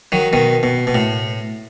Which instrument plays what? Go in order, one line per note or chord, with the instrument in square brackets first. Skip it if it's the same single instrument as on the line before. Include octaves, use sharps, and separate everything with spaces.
[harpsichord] D#3 F#3
B2 D#3
B2
B2
A2